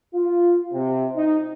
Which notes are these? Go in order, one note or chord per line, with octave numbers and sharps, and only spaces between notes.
F4
C3
D#4